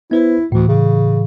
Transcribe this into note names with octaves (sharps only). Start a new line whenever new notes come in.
B3 E4 B4 C5
D2 A2 E3
C#3